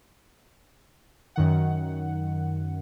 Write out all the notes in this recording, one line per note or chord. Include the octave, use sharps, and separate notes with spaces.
F#2 D#3 F#5